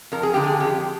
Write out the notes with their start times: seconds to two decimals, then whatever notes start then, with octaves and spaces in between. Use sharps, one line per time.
0.12 F2 A#4
0.23 G#4
0.34 D3 G#3 G4
0.44 G#4
0.60 F2 G4